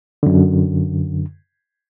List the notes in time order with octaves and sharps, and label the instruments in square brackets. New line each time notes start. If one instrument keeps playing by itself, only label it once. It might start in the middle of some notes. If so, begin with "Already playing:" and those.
[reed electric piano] F#2 D3